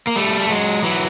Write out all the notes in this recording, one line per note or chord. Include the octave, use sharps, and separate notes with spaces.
A#3
G3 A3
A3
F#3 G#3
E3 F#3